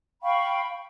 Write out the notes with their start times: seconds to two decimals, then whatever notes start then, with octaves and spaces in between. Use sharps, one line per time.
0.22 F5 G5 B5 C#6